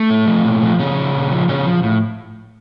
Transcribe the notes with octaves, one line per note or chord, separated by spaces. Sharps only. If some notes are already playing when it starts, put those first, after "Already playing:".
Already playing: A3
A2
F3
A#2
F3
A#2 C#3 C#4
F3
A#2
F3
A#2 C#3 C#4
F3
A2